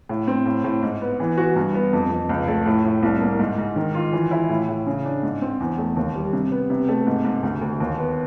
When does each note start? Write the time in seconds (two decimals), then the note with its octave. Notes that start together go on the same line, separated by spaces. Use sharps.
0.09 A2
0.27 C4
0.46 A2
0.64 A2
0.82 G#2
1.01 B3
1.20 E3
1.37 F#4
1.56 G2
1.75 B3
1.93 F2
2.11 F2
2.29 C#2
2.48 A3
2.66 A2
2.85 A2
3.03 C2
3.21 A#3
3.39 G#2
3.58 G#2
3.76 D#3
3.95 F4
4.13 E3
4.31 E4
4.49 A2
4.68 A2
4.86 C#3
5.05 D4
5.23 G#2
5.41 C4
5.60 E2
5.78 A3
5.97 D#2
6.15 G3
6.33 C3
6.51 B3
6.70 C3
6.89 A3
7.07 G#2
7.25 G#2
7.43 D2
7.61 D2
7.80 D#2
7.98 B3